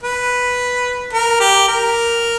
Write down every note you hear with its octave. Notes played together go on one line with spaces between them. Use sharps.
B4
A#4
G4
A#4